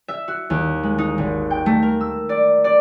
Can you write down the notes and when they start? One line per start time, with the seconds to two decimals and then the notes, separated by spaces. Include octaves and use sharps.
0.08 E5
0.28 F#4
0.50 D#2
0.83 G#3
0.98 D#4
1.18 G#1
1.51 G5
1.66 A3
1.82 A#4
2.01 E6
2.29 D5
2.64 D5